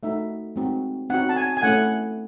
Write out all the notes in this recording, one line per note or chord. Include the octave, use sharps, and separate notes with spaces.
A3 D#4 F#4 E5
G#3 C4 D#4 F#4
C4 D#4 F#4 F#5
A5
G#5
G#5
A3 C#4 E4 F#5